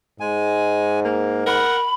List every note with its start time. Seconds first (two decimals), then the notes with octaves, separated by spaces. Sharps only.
0.20 G#2 G#3 G#5
1.05 A#3
1.46 A#4 F#5 B5